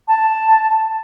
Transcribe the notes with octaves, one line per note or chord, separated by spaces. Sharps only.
A5